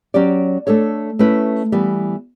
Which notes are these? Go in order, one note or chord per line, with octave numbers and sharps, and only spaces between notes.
F#3 C#4 G4 D5
A3 D4 A4 C#5
A3 C#4 E4 B4
E3 G3 B3